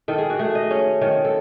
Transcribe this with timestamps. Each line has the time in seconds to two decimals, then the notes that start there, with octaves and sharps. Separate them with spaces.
0.08 D#3 A4
0.18 G#4
0.30 F#4
0.39 A3 G#4
0.55 D#5
0.71 C#4
1.01 D#3 C#5
1.25 A4